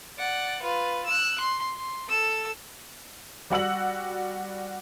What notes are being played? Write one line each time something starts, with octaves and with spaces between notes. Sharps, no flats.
D5 F#5
F4 B4
E6 F#6
C6
C6
A4 E6
G3 F#4 F#5 E6 F#7